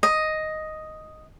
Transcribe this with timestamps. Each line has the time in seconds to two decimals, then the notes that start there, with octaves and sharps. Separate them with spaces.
0.03 D#5